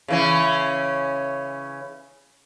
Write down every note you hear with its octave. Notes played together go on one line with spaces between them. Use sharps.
C#3 E3 C#4